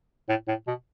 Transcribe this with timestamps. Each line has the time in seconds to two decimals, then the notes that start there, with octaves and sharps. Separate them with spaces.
0.29 A2
0.48 A2
0.68 B2